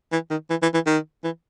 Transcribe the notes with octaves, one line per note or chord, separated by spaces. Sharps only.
E3
D#3
E3
E3
E3
D#3
E3